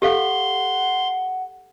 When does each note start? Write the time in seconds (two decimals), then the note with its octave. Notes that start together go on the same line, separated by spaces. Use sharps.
0.02 G4 A4 F5 F#5 C6